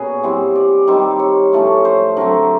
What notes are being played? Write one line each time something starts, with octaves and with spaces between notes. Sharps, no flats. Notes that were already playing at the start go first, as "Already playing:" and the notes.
Already playing: A#2 B3 C#4 F#4 G#4
E3 G3 C4
D5
D#3 G3 C4
C#5
A2 F3 A3 C#4
C5
D3 F#3 A3 C4 A#4